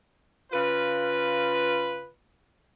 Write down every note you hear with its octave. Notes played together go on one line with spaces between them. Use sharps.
C#3 F4 B4